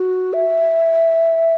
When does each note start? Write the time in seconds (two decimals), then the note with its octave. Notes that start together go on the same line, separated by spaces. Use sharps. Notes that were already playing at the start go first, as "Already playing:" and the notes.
Already playing: F#4
0.33 E5